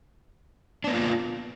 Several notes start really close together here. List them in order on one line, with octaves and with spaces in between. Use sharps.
D4 B3 A#3 F4